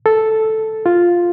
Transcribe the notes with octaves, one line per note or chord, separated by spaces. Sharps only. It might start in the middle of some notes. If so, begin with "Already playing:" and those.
A4
F4